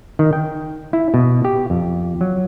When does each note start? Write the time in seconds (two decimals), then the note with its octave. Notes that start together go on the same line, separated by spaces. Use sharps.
0.19 D#3
0.33 G5
0.93 E4
1.14 B2
1.45 G4
1.70 F2
2.21 F#3